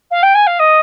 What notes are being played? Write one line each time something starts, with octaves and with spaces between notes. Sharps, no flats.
F5
G5
G#5
F5
D#5